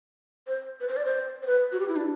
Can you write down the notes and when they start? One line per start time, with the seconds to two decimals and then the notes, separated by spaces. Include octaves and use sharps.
0.47 C5
0.80 B4
0.88 C5
0.97 D5
1.05 C5
1.42 C5
1.47 B4
1.72 F#4
1.80 G4
1.88 E4
1.96 D4